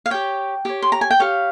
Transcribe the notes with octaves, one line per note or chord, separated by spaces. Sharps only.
F5
G4 C#5 G5
G4 C#5
C6
A#5
G#5
G5
G4 C#5 F5